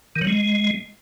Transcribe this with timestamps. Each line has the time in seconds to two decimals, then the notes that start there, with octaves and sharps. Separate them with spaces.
0.16 D#3
0.21 F#3
0.27 G#3